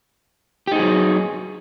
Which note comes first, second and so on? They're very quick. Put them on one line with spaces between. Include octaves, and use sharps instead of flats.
G4 D#4 G#4 F#3